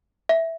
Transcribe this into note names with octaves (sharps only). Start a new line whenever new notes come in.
E5